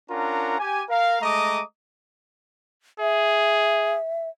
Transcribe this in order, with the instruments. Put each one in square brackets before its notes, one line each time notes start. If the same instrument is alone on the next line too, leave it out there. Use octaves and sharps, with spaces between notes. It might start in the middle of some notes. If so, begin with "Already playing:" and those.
[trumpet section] C#4 D4 F4 A#4 F#5 A#5
G4 G#5
A#4 F5
G#3 A3 D#5 A#5 D6 D#6
[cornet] G#4 [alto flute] E5